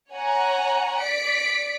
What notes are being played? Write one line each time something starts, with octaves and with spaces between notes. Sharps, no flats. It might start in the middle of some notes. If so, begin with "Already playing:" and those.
C#5 F#5 G#5 A#5
D5 B6 C#7 D7